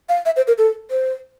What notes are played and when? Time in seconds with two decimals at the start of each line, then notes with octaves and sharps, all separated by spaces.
0.09 F5
0.26 E5
0.36 C5
0.48 A#4
0.58 A4
0.91 C5